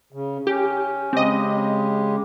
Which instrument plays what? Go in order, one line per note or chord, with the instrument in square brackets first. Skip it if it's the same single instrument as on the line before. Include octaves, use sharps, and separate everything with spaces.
[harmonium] C#3
[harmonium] C#4 [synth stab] G4
[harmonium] C#3 G#3 G4 [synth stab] C4 D#5